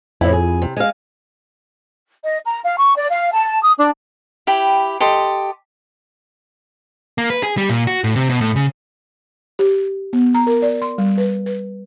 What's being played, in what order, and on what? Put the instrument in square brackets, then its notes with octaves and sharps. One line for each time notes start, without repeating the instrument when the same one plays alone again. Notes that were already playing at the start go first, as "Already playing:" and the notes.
[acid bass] F2 [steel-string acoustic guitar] A2 E4
[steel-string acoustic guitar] G#4
C3
G#3 F5
[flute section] D#5
A#5
F5
C#6
D5
F5
A5
D#6
D4
[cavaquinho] E4 G4 G5 B5
G4 A4 D#5 C6
[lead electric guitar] A#3
B4
G#4
G3
A#2
F#4
A2
C3
B2
A2
C#3
[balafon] G4
B3
A#5
A#4
D5
C6
G3
B4
B4